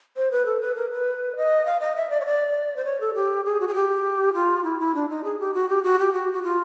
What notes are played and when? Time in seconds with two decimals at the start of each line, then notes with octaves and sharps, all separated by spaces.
0.16 C5
0.32 B4
0.46 A4
0.61 B4
0.76 A#4
0.91 B4
1.36 D#5
1.65 F5
1.80 D#5
1.96 E5
2.10 D5
2.21 C#5
2.26 D5
2.76 C5
2.85 C#5
3.01 A4
3.14 G4
3.45 G#4
3.60 F#4
3.68 G#4
3.75 G4
4.34 F4
4.64 E4
4.80 E4
4.95 D4
5.09 D#4
5.24 G#4
5.39 G4
5.54 F#4
5.69 G4
5.83 F#4
5.99 G4
6.13 F#4
6.33 F#4
6.44 F4